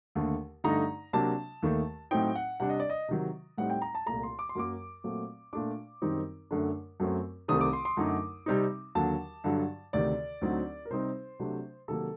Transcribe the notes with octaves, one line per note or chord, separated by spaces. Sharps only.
D#2 D3 A3
G2 D3 A3 D#4 A#5
C3 F#3 A#3 D4 A5
D#2 D#3 A3
A2 F#3 C4 D#4 G5
F#5
C3 G3 D4 F#5
D#5
D5
D#5
C3 D#3 F#3
A2 G3 C4 D#4 F#5
G5
A#5
A5
C2 A#2 A3 A#5
C6
D6
C6
F#2 F#3 A#3 D6
A#2 F#3 A3 C4
A#2 A3 D4 D6
F#2 D#3 G3 C4 D#4
F#2 D3 A3 D4
F#2 F#3 A3 C4
C2 C3 D#3 A3 C4 D#6
D6
C6
C6
F#2 D3 F#3 A3 D#4
C3 G3 C4 D#4
D#2 D3 F#3 A5
G2 D3 F#3
D2 C3 D#3 D5
D2 D3 F#3 C4 D#4
A#4
C3 G3 C4 D#4 C5
C3 F#3 A3 D4
C3 D#3 F#3 A#3 A4